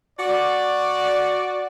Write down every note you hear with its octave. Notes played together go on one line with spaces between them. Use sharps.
F#4 D5